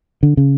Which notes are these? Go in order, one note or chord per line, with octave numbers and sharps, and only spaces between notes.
D3
C#3